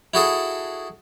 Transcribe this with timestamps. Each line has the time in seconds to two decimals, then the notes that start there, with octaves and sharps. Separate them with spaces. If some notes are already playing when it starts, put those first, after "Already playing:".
0.14 E4 F#4 G#4 A4